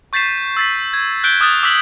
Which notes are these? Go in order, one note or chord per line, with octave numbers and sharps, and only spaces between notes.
C#6 G6 A6 B6 C7 E7
E6 A6 B6
G#6
F#6 G6 D7 G7
D6 D#6 F6 F#6 G#6 A6
D6 E6 F#6 B6 F#7